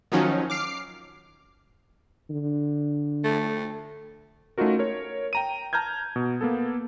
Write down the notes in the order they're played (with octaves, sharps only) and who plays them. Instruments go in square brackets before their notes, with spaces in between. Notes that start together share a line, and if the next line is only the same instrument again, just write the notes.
[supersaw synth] D#3 F3 F#3 C#4 D#4
D6 F6 C7
[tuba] D3
[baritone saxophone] A3
[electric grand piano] A3 C#4 D#4 F4 F#4 A#4
A#4 C#5
G5 A#5 D#7
A5 A#5 F6 G6 G#6
B2
A#3 B3 A4